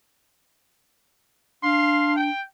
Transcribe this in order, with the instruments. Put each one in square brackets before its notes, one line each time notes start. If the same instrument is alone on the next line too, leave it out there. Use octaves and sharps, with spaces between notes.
[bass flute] D4 [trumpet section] F5 C6
[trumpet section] G5